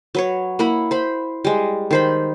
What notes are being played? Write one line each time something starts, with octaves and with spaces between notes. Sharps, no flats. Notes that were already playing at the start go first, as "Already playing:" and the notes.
F#3 B4 C#5
A#3 E4 F#5 B5
C5 B5
G3 G#3
D#3 C5 B5